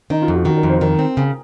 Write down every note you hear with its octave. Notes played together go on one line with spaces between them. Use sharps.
D#3 D#4
F4
F2
F#4
D#3 F#4
A#4
F2
C5
D#3 A#4
C4
C#3